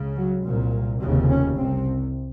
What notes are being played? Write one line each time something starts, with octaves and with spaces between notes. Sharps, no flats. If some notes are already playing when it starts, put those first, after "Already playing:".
Already playing: C#2 C#3
F#3
C2 A#2
F1 D#2 C#3 F#3
C#4
C2 C3 C4